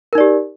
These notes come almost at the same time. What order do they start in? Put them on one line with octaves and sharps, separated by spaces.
A#4 D#4 D5 G4